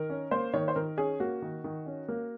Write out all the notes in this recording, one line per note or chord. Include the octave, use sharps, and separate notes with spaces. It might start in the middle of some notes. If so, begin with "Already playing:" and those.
Already playing: D#3 A#4
C#4
A#3 C5
D#3 C#5
C5
D#3 A#4
C#4 G#4
A#3 F#4
D#3
D#3
C#4
A#3